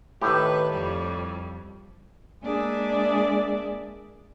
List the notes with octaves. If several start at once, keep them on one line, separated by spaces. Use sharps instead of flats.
A2 D#3 G4 B4
F2 G3
G#3 A#3 D4 G#4 D5 E5